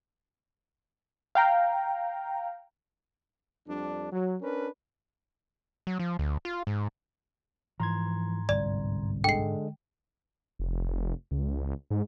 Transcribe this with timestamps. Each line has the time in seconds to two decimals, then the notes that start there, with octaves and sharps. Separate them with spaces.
1.35 F5 G5 A#5
3.67 F2 G3 D4
4.12 F#3
4.41 C#4 D4 A#4 B4
5.87 F#3
5.99 F3
6.19 D2
6.45 F4
6.67 G#2
7.80 G#2 E3 F3 A#5 C6 G#6
8.49 G1 C2 D5
9.24 D3 G#3 G5 C7
10.59 F1
11.31 C#2
11.90 G#2